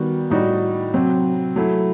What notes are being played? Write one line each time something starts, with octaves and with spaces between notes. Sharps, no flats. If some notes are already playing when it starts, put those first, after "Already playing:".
Already playing: D#3 G3 B3 F#4
A2 G3 D#4 F#4
C3 F#3 C4
F#3 A3 E4